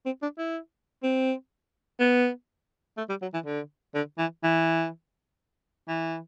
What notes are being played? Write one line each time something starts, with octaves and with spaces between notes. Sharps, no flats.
C4
D4
E4
C4
B3
A3
G3
F#3
E3
D3
D3
E3
E3
E3